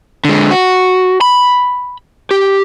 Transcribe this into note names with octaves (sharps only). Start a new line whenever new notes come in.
D3 G#3
F#4
B5
G4